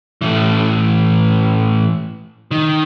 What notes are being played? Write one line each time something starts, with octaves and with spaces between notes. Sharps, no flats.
A2 E3
D#3